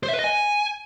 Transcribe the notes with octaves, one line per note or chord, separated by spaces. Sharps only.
C5
E5
B4
D#5
G#5